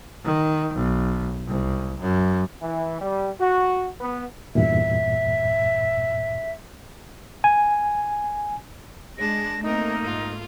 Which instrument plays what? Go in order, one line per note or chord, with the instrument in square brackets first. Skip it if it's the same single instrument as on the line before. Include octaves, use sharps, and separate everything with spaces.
[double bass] D#3
B1
C2
F#2
[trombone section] E3
G3
F#4
B3
[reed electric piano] E2 G2 A#2 [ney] E5
[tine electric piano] G#5
[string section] G#3 [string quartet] D4 A5 [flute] A#6
[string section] A3 A#3 [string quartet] C4 A#4 D#5 [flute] D#4
[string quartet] G#2 F4